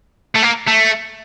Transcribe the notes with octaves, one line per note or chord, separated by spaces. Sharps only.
A3
A#3
A3